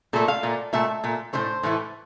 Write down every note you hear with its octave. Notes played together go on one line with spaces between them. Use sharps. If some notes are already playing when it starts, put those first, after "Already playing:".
A#2 A3 A4
F5
A#2 A3
A#2 A3 E5
A#2 A3
A2 E3 A3 C5
A2 E3 A3